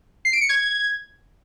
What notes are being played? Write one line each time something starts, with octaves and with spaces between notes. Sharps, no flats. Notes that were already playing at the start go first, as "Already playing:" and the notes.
C7
D7
C#7
G#6